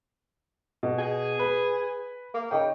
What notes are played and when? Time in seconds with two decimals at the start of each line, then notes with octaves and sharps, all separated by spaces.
0.83 B2
0.98 G#4
1.39 B4
2.34 A#3
2.51 C#3 D#4 G5